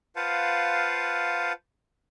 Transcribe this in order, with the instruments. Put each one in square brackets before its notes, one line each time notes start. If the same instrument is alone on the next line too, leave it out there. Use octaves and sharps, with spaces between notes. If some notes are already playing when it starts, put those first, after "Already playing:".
[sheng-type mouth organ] F4 B4 C5 F5 F#5 A5